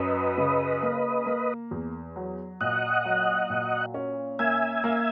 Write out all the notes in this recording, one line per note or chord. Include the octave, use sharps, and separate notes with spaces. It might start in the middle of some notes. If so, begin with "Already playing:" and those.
Already playing: F#2 F#3 B4 D#5
C#3
A#3
A#3
E2
F#3
A#2 D#5 F#5
F#3
A#2
C#4
A#3 E5 G#5
A#3